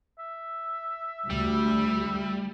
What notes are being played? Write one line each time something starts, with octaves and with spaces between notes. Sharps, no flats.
E5
D2 G3